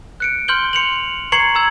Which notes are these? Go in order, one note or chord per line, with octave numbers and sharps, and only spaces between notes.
F#6 C#7 D7
C6 F6 G6 F#7 G7
C6 C#7 F7 F#7
A#5 C#6 G#6 C7 C#7 F#7
A#5 E6 G#6